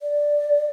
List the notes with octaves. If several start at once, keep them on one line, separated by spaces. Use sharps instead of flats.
D5